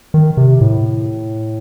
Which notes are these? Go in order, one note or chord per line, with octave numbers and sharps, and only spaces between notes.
D#3
C3
A2